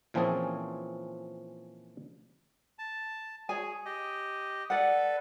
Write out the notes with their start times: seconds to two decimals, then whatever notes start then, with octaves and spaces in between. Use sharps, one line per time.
0.14 A#2 E3 F3 C4 C#4 G#4
2.79 A5
3.49 G#4 C#5 G#5
3.86 G4 D#5
4.70 A4 B4 D5 F#5